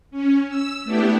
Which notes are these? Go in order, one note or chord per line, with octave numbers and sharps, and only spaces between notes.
C#4
E6
A3 B3 D4 E4 G4